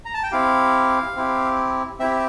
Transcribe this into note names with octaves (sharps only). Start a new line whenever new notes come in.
A#5
A5
G5
C4 E4 G4 F5
C4 E4 G4
C4 E4 G4 E5